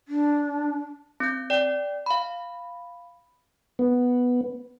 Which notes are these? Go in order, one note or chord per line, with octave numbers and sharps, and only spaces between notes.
D4
C4 G6
D5 G5
F5 B5
B3